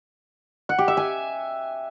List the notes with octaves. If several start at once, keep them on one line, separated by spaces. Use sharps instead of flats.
F#5
G4
E5
G#5